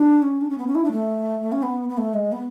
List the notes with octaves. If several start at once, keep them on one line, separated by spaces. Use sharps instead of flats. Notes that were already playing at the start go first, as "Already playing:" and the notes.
Already playing: D4
C#4
D4
C#4
B3
C#4
E4
D4
A3
C#4
B3
B3
A3
G#3
B3